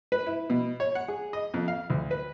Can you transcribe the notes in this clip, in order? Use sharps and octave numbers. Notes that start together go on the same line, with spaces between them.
B4
E4
B2
C#5
F#5
G#4
D#5
F2
F5
D2
B4